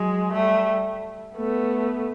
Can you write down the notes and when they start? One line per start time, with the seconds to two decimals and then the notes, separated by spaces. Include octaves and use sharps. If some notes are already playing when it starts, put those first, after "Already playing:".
Already playing: F#3 G#3
0.33 G3 A3
1.36 A3 B3